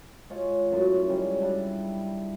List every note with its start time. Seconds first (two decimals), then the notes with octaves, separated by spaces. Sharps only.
0.30 G#3 F4 C#5
0.72 F#2 A2 C6
1.09 C#3 G3 G#3
1.41 G3 D4 E4